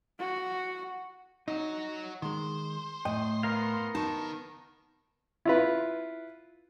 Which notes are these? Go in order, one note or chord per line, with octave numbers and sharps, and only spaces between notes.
F#4
F#3 D#4 F#4
D#3 G#3 C5
A2 D#5 G5
B3 A#4 F5
B1 D#3 D#4 A5
E4 F4 B4